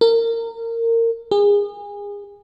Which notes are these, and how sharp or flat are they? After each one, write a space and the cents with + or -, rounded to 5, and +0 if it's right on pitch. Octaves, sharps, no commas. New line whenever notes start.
A#4 -25
G#4 -30